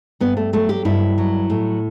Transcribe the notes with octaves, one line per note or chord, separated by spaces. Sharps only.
G2 B3
A3
F#3 A3
G4
G2 E4
F#3
A2